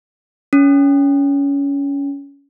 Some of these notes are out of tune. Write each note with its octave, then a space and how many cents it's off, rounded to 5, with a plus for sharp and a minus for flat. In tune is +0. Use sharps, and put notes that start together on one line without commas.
C#4 +20